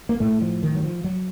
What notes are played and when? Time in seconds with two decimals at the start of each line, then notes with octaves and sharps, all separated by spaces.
0.09 A#3
0.20 A2 A3
0.41 F3
0.63 D#3
0.75 F#3
0.83 F3
1.04 F#3